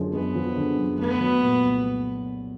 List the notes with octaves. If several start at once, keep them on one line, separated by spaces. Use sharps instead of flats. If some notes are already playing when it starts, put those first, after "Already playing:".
Already playing: F#2 D3 F3 G#3
G#3 B3
F3
D3
F#2
A3 B3
F#3
A#2
C2